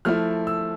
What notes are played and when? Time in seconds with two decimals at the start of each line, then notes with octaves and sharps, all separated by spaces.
0.05 F3 A3 E4 F6
0.47 E6